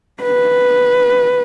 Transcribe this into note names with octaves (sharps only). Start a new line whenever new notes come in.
B4